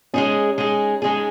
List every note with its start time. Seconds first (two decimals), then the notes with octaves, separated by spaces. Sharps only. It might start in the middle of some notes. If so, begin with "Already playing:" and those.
0.14 G#3 C#4 D#4 G#4
0.58 G#3 D#4 G#4
1.02 G#3 C#4 D#4 G#4